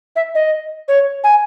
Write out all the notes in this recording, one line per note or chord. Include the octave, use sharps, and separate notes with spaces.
E5
D#5
C#5
G#5